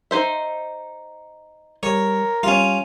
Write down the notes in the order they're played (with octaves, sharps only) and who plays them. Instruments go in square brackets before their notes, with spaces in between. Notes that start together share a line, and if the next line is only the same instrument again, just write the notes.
[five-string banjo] D#4 C5 E5
[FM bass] G3 [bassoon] A#4 [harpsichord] C#5
[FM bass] G3 [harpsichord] C#4 F4